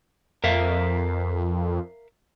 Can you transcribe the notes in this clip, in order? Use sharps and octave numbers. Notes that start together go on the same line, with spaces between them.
F2 A#4 E5 F5